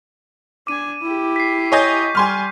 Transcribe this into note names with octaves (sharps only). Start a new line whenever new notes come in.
D4 G#5 D6 D#7
E4 G4
B6 C7
C#5 D#5 G#5 C#6 G6
G3 G#5 C6 F6